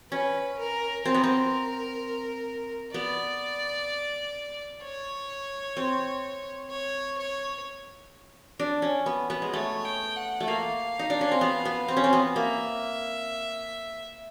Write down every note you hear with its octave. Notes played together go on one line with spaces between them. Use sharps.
C#4 B4
A#4
C4 A#4
B3
C4
B3 D5
C#5
C4
C#5
C#5
D4
C#4
B3
B3
G#3
A3 C#5
G5
F#5
A3
A#3 F5
D#4
D4
C#4
C4
B3
B3
C4
C#4
C4
B3
A#3 E5